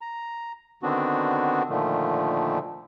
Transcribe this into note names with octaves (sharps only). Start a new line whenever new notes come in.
A#5
D3 D#3 B3 C4 D4 F#4
A#2 D3 D#3 F3 A3